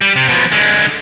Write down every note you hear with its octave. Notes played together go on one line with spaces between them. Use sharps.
G3
C3
B2 F3
D3 G#3